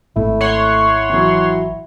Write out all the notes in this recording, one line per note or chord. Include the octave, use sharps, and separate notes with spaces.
G#1 A3 E4
C#5 F#5 C6
E3 F#3